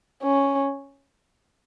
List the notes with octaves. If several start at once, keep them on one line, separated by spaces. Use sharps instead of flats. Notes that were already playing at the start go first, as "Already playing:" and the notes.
C#4